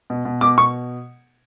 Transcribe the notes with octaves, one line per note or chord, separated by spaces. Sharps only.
B2
B2
B2 D6
B2 C#6